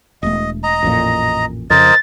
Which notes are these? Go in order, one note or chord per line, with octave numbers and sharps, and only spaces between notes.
E1 A3 D#5
D#5 A#5
A1 F2 A#2
F2 C#3 A#4 C5 D#5 A6